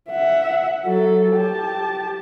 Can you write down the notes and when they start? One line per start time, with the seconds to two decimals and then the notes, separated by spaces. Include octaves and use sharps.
0.10 E5 F#5
0.86 F#3 A4
1.36 G4 A5